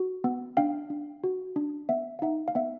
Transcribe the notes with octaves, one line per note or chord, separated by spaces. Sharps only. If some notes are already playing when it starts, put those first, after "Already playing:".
Already playing: F#4
B3
D4 F5 G5
D4
F#4
D4
B3 E5 F#5
F5
D#4 E5 F#5
F5
B3 E5 F#5